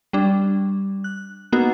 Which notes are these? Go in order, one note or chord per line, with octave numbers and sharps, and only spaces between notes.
G3 D4
F#6
A#3 B3 D#4 F#4